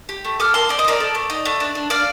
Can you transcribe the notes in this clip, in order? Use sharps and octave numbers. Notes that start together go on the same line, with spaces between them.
G4
A3
A4 D6 F6
A#3 A5 C6
C4 D5
D#5
C4 A#4 D5
A4
A3
D#4
A3
D4
D4
D4 D5 F5